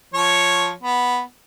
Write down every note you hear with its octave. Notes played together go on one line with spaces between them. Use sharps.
F3 C#5
B3